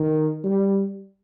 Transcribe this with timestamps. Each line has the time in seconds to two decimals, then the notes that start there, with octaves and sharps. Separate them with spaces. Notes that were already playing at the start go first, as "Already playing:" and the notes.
Already playing: D#3
0.44 G3